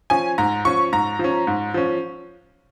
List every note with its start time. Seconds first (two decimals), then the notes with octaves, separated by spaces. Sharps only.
0.10 F3 C#4 G#5
0.38 G#2 A#5
0.65 F3 C#4 C#6
0.92 G#2 A#5
1.19 F3 C#4
1.47 G#2
1.74 F3 C#4